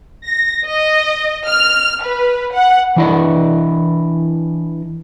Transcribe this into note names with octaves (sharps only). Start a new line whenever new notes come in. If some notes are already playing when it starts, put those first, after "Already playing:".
A#6
D#5
F6
B4
F#5
E3 D4 E4 D5 D#5